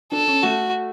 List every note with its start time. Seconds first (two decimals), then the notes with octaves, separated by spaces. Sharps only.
0.12 D4 A4
0.28 C#4
0.43 A3 F#4